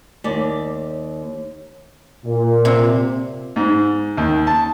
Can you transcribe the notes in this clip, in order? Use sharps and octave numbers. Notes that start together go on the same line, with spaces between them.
D#2 D5
A#2
C3
G#2
D#2
A5